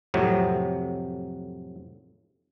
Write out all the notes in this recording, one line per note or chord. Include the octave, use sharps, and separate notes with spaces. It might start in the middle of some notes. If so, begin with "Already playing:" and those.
F2 A2 C3 F#3